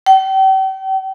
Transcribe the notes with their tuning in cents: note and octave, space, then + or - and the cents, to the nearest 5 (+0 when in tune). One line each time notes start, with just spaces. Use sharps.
G5 -40